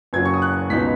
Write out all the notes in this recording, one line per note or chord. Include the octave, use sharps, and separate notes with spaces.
F#1 F#2 F#3 G#6
C#6
D#6
F#6
C#2 B2 B3 D#4 B6